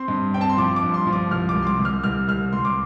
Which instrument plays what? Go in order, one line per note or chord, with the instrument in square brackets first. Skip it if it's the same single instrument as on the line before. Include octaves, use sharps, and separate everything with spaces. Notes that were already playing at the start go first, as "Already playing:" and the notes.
Already playing: [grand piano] C4 C6
G2
C4 G5
A5
C6
F3 D6
D6
G2
C6
F3
D6
C2 F6
D6
C2
C6
D6
C2
F6
C2 F6
C2 F6
C2 C6
D6